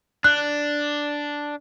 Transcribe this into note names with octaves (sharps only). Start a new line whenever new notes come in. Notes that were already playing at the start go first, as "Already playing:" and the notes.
D4 F#6